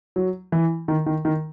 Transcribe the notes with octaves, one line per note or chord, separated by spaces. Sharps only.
F#3
E3
D#3
D#3
D#3